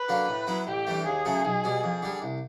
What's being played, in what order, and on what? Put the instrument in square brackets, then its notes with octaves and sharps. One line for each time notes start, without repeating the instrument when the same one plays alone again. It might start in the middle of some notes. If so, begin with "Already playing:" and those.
Already playing: [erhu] B4
[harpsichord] D3 F#3 A#3
A2
F#3 B3 E4
[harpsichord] A1 [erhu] G4
[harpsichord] G2 E3 A3
[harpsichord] D#2 [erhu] G#4
[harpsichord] C#3 F#3 A3
B1
B2 G3
F2
D3 G3
C2